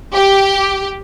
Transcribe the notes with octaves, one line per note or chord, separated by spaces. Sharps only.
G4